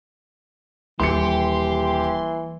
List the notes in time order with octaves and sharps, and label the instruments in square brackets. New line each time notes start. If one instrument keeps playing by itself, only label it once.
[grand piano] D#1 C#7 [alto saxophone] E3 [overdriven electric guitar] G4 [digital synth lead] C6